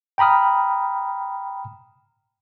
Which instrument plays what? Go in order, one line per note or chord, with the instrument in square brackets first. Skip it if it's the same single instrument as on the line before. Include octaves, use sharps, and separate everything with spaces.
[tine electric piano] G5 A#5 B5 D#6 F6